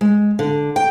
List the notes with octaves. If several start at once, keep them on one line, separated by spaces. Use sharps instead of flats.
G#3
D3
G5